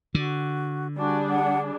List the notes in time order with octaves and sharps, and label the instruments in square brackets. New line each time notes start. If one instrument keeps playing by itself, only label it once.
[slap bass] D3 [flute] F#4
[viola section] G3 D4 G#4 [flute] F#4
[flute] F#5